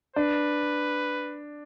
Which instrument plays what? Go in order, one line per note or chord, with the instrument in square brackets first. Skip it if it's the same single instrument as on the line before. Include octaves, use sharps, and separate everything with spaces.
[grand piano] D4 [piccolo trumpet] B4